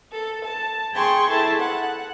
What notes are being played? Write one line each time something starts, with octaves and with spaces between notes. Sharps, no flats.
A4
A5
G#4 G5 C6 C#6
E4 G#4 A4 A5
F#5